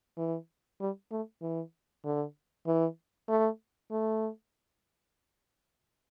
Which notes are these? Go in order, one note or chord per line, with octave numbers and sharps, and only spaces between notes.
E3
G3
A3
E3
D3
E3
A3
A3